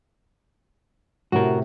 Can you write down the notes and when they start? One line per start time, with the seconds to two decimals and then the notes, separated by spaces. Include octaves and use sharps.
1.32 A2 C3 F#4 A#4